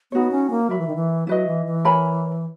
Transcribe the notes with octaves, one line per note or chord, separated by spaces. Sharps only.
B3 D#4 F#4 C#5
C#4
A#3
F#3 A#4 E5 B5
E3
D#3
E3
F#3 E4 B4 D#5
E3
E3
A#4 C#5 G#5 B5